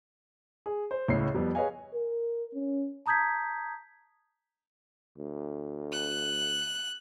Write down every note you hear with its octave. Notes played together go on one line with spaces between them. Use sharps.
G#4
C5
C#2 A2 C#5 C7
F2 G3 B3
G#4 B4 C#5 D#5 F5 G#5
A#4
C#4
A5 A#5 D#6 G6 G#6 B6
D2
F#6